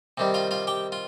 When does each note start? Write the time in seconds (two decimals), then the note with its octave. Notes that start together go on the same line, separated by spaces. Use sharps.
0.18 C3 D#3 G3
0.34 F4 F5
0.51 F4 F5
0.67 G4 G5
0.92 F4